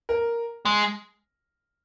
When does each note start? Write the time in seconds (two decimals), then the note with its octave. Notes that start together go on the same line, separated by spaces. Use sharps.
0.09 A#4
0.65 G#3